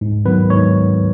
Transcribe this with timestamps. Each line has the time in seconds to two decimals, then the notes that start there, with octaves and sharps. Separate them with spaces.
0.01 G#2
0.25 D#3 F#3 B3 B4
0.50 G#2 C#5